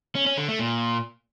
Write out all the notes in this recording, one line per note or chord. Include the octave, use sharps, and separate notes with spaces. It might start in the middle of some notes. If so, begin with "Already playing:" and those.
C#4
C#4
D3
A3
A#2